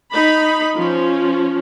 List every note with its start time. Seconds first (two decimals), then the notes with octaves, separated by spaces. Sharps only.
0.11 D#4 B5
0.76 F3 C#4